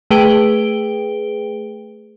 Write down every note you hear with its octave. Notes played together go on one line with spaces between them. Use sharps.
A3 G#4 B4 G5 D7 G7